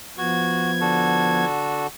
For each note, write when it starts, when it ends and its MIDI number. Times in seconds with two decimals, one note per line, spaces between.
0.18 1.45 53
0.18 1.45 59
0.18 0.71 66
0.18 1.45 92
0.81 1.87 50
0.81 1.87 66
0.81 1.87 69